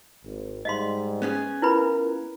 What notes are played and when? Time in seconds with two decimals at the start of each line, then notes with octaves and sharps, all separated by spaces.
0.24 G#1
0.65 G#2 G3 G#3 D#5 F5 C6
1.22 B3 C#4 G#4
1.62 E4 F4 A#4 B4 B5